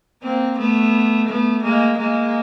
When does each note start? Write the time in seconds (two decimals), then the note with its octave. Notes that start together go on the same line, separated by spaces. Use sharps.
0.23 A#3 C4
0.58 A3 B3
1.28 A3 B3
1.63 G#3 A#3
1.97 G#3 A#3